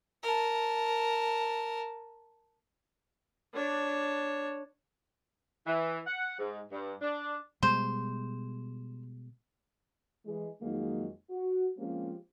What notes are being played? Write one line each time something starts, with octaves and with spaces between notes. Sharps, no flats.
A#4 A5
D4 C#5
E3
F#5
G#2
G2
D4
B2 G3 G#3 C5
E3 G#3
F2 D#3 F#3 G#3 A#3 D#4
F#4
F3 G#3 A#3 C4 C#4 G4